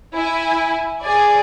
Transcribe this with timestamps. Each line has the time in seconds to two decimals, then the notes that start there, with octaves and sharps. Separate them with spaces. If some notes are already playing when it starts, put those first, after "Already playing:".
0.15 E4 G#5
1.02 G#4 D5 G#5